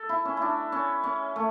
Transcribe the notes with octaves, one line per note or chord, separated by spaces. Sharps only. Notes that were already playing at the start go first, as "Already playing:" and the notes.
Already playing: A4
E4
C#4
D4 E4
C#4
C#4
A3